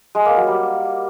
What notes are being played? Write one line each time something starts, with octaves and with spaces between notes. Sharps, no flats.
G#3
A#3
F#3
G3